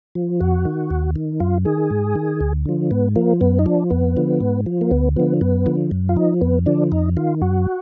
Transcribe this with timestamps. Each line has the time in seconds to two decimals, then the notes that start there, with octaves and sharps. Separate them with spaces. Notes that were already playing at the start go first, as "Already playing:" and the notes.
0.15 F3
0.40 F2 F#4
0.65 D#3
0.91 D#2
1.16 D#3
1.40 F#2 F4
1.65 D#3 G#4
1.90 G#2
2.15 D#3
2.41 D2
2.65 D3 F3
2.91 G#2 B3
3.16 F3 A#3
3.41 F#2 B3
3.59 D#4
3.66 F3 D4
3.90 F2 B3
4.17 D3 F3
4.41 G#2
4.66 F3
4.81 A#3
4.91 D2 B3
5.16 D3 F3 B3
5.41 F#2 B3
5.66 D3 F3
5.91 F#2
6.09 F4
6.16 F3 D#4
6.41 F2 B3
6.66 D3 F3 D4
6.92 F2 D#4
7.17 D#3 F4
7.42 F#2 F#4